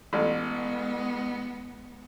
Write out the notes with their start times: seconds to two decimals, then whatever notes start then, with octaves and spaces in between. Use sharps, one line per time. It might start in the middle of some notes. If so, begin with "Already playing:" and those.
0.13 A1 G#3 B3